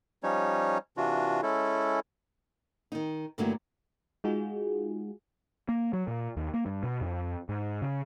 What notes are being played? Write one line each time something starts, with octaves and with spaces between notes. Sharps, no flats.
F3 G3 C#4 D#4 C#5
C3 E3 D4 F4 F#4
G#3 C#4 E4 A4
D#3 D#4
G2 D3 F#3 A3 A#3 E4
G#3 D#4 F4 F#4 G#4
A#3
F#3
A#2
D#2
A#3
G2
B2
F2
G#2
C#3